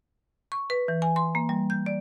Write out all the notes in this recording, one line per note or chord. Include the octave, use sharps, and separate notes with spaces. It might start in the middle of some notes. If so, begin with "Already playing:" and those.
C#6
B4
E3
G#5
C6
A#3
G3
G6
D5